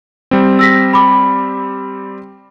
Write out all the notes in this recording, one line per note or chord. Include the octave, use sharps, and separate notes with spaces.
G3 C4
E6 A#6 B6
B5 D6